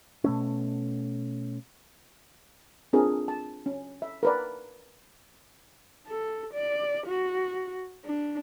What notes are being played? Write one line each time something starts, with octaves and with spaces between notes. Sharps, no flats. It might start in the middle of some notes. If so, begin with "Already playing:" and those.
B2 A3 C#4
C4 D4 F4 G#4 A#4
A5
C#4
E5
A#4 B4 D5
A4
D5
F#4
D4